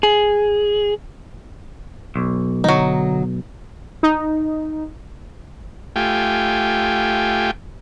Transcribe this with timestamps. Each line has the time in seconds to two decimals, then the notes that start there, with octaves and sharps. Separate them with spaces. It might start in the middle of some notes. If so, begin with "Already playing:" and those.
0.03 G#4
2.16 B1
2.64 D3 F#3 D#4
4.03 D#4
5.96 A3 F4 G4 G5 G#5